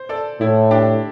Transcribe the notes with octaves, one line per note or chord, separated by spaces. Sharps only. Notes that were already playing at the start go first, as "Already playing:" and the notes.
Already playing: C5
A4 D5
A2 E4
D4 G4